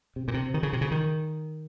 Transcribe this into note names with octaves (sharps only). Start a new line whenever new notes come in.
C3
A#2
C3
D#3
C#3
C3
C#3
D#3